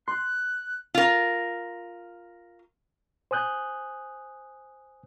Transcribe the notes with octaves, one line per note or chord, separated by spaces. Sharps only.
C6 F#6
F4 A#4
C5 G#5 D#6 F#6 G6